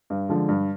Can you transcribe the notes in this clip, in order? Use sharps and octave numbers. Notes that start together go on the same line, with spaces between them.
G2
D3 F3 G#3
G2